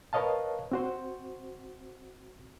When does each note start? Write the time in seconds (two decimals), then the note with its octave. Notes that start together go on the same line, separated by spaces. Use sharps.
0.13 A#4 B4 C#5 D#5 F5 A5
0.72 C4 F#4 C5